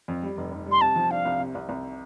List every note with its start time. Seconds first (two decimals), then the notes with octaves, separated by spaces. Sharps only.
0.08 F2
0.23 G3
0.37 F1
0.52 F1
0.66 G3
0.71 C6
0.81 C3 A5
0.96 F3
1.11 D4 F5
1.25 C2
1.40 C3
1.55 C2
1.69 C2